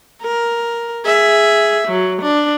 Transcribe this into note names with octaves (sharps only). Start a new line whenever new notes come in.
A#4
G#4 E5
F#3
D4